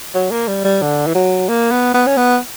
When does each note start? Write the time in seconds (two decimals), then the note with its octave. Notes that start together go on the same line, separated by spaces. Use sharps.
0.15 F#3
0.31 A#3
0.48 G3
0.65 G3
0.82 D3
1.07 E3
1.15 F#3
1.49 A#3
1.71 B3
1.94 B3
2.07 C#4
2.17 B3